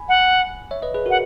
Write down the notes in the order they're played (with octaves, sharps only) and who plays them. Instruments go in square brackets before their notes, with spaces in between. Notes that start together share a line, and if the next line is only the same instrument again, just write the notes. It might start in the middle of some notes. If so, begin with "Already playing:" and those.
Already playing: [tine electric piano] G#5 B5
[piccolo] F#5
[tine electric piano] C#5 E5
B4 D#5
G#4 B4
F#4 A#4
[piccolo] F#5